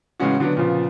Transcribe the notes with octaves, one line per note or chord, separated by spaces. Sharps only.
A2 C#3 E3 G#3 C#4 F#4
D3 F#3 B3 D4
A#2 C#3 F3 B3